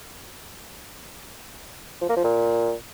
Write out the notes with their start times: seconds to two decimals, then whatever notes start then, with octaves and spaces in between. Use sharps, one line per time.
2.02 F3
2.09 A#3
2.17 F3
2.24 A#2